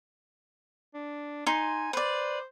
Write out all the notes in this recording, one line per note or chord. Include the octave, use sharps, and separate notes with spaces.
D4
D#4 G#5 C6
B4 C5 D5